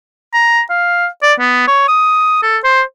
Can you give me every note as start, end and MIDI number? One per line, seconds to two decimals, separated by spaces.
0.34 0.61 82
0.70 1.06 77
1.23 1.33 74
1.40 1.67 59
1.68 1.86 73
1.88 2.42 87
2.42 2.58 69
2.64 2.81 72